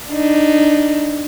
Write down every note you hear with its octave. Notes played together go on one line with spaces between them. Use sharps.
D4 D#4